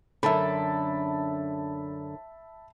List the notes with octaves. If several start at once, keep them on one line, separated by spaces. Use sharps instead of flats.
F#2 D3 E5 A5 B5